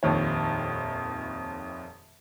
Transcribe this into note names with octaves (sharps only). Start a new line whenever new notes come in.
D#1 A#1 F2 D#3 C#5